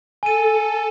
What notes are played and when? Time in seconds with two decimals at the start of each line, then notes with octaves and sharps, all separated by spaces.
0.23 A4 G#5 D#7